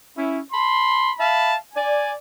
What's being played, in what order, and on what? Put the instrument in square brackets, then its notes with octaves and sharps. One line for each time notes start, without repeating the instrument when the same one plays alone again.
[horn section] C#4 E4
A5 B5 C6
E5 F5 A5 B5
D5 G#5